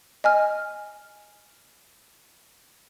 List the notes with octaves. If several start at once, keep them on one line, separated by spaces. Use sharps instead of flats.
D#5 G#5 F6